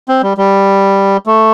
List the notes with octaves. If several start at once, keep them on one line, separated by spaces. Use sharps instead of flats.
C4
G3
G3
A3